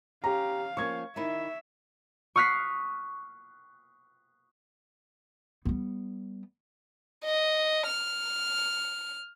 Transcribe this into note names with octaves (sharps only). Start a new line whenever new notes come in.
C#4 G4 F5 A#5
F3 A#3 C#4 C#6 G#6
D#3 D#4 E4 E5
C#6 D#6 F6 F#6 B6 C7
G3 B3
D#5
F6